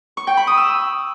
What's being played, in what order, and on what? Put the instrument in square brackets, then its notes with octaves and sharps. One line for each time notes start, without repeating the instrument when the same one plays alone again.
[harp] C#6
G5
B5
D#6
E6